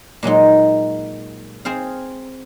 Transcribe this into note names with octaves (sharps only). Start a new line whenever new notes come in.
A#2 F#3 G#3 D#4
C4 G#4 C5 F5